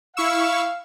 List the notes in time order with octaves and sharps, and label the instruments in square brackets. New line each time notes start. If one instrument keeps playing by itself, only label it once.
[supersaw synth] E4 C#6 E6 [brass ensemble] F5